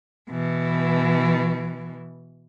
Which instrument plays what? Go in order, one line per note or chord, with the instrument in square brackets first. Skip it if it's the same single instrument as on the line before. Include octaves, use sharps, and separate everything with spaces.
[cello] B2 E3